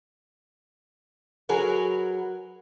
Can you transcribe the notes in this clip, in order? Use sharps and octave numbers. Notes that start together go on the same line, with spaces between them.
F#3 G#4 A#4 B4